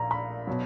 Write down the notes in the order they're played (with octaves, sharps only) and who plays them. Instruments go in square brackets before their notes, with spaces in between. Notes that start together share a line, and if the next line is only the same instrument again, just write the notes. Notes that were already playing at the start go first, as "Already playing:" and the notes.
Already playing: [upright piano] A#1 A#2 A#5
B5
B2 F#3